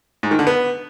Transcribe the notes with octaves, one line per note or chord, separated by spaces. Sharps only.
G#2
D#3
D3
B3